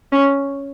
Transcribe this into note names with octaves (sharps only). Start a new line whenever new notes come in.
C#4